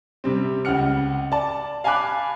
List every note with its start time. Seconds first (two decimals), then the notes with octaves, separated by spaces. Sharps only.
0.24 C3 G3 C4
0.65 C#2 C#3 F#5 F6 C#7
1.32 D5 A5
1.84 F5 G#5 A5 B5 D6 F#6